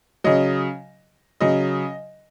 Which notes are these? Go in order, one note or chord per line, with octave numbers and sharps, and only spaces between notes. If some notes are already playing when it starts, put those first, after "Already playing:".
C#3 F#3 D#5
C#3 F#3 D#5